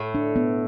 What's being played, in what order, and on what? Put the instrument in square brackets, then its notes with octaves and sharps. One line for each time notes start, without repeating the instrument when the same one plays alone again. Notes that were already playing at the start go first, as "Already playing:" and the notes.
Already playing: [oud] A2
[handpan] D4
B3